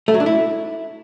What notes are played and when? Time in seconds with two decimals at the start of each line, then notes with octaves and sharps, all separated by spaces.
0.08 A3
0.14 F#3
0.20 D4
0.26 E4